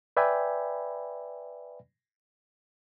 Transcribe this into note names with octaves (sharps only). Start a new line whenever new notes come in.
B4 D5 E5 G5 G#5 B5